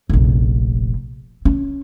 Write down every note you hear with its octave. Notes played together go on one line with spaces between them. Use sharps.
F1 A#1
C#4